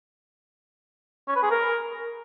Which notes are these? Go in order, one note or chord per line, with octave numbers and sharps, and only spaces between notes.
C#4
B4
G#4
A#4